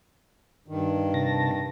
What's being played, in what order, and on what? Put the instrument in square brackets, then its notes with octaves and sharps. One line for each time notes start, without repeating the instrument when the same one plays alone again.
[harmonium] G2 D#3
[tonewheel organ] C3 A5 A#6